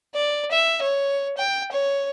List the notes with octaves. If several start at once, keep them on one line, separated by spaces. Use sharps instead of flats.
D5
E5
C#5
G5
C#5